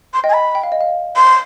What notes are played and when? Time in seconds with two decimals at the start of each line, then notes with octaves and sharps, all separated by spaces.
0.13 C6
0.24 D#5 G5
0.29 G#5
0.33 B5
0.55 G5
0.63 F5
0.72 D#5
0.81 F5
1.16 C6